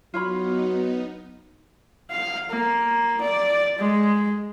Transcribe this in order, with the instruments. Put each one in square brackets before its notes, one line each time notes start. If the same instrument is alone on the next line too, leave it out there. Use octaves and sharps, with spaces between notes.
[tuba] F#3 [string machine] B3 D#4 [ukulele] F4 C#5 B5
[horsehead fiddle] F5
A#3
D5
G#3